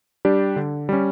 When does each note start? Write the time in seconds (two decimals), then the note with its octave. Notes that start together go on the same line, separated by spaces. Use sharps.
0.25 G3 D4 G4
0.56 D3
0.89 G3 C#4